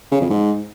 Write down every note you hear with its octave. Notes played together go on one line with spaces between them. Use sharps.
C#3
F2
G#2